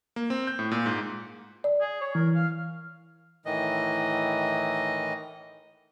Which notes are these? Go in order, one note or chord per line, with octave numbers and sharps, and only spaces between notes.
A#3
C4
G6
A2
A#2
G#2
D5
G#4
C#5
E3 A#4
F5
A2 D#3 E3 D#5